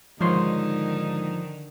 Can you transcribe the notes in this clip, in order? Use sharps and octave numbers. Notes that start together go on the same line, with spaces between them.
G#2 D3 D#3 F3 D#4 C#5 C6